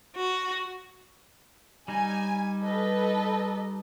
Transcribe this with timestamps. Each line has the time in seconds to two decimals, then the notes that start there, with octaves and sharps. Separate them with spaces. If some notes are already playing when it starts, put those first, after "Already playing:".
0.16 F#4
1.88 G3 D#4 G#5
2.61 A4 B4 D#5